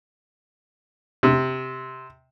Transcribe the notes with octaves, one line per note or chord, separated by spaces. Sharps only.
C3